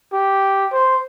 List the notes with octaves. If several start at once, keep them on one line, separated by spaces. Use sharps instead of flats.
G4
C5